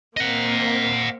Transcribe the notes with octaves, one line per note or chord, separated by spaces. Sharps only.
A#3 C4 D#5 F#5